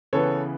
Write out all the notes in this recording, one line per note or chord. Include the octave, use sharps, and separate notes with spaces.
C#3 E3 B3 A4 C#5